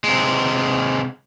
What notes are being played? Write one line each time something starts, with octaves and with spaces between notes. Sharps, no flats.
C3 G#3